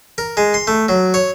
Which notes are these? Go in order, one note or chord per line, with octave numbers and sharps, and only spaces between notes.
A#4
G#3
C6
A3
F#3
C#5